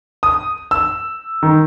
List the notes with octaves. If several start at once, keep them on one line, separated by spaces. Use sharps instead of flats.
D#6
E6
D#3